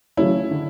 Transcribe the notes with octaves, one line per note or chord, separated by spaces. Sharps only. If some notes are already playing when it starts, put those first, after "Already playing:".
C#3 F#3 A3 C#4 E4
D3